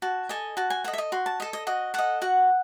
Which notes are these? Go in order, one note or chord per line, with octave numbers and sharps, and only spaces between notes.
F#4 A5
A4 D#5 G#5
F#4 A5
G#5
A4 D#5 F#5
E5
D#5
F#4 C6
A5
A4 D#5
D#5
F#4 D#5
A4 D#5 F#5
F#4 F#5